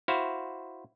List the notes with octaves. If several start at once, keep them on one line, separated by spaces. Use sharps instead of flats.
E4 F#4 C5 F5